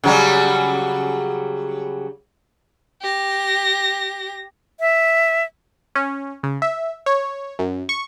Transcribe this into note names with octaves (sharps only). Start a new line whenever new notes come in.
C#3 F#3 G3
G4 A#6
E5
C#4
C#3
E5
C#5
F#2
C#6